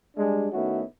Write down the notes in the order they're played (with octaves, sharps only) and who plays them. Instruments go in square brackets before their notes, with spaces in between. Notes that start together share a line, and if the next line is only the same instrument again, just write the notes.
[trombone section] G3 G#3 D4
D#3 A3 B3 C#4 E4 F#4